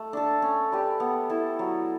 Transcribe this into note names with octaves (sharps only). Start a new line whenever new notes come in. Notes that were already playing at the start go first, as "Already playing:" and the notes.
Already playing: A3
D4 A4
C#4
G4 B4 D5
B3
E4 A4 E5
F#3